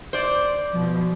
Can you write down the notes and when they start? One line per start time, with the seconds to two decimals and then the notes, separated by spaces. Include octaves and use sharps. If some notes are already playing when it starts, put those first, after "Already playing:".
0.13 C5 D5
0.71 B2 F3